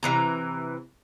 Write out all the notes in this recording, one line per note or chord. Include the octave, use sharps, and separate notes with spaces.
C3 E3 A#5